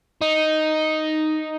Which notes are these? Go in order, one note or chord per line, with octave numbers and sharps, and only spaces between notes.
D#4